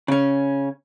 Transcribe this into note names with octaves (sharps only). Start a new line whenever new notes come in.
C#3 C#4